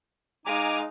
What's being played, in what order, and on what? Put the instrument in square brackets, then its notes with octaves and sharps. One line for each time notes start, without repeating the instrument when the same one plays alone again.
[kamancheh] G#3 F5 [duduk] D#4 [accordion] G#5 A#5 D6